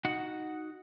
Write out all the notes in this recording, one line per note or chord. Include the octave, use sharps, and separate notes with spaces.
D#4 F#4 F#5